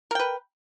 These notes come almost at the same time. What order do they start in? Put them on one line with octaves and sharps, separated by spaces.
A#4 G5 B4